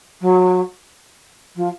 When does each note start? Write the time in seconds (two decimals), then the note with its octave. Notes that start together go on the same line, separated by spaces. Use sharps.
0.20 F#3
1.55 F3